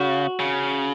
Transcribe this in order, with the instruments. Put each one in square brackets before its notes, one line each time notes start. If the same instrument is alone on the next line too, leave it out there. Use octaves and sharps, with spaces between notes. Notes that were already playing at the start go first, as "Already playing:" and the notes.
Already playing: [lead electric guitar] C#3 [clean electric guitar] F#4
[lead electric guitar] C#3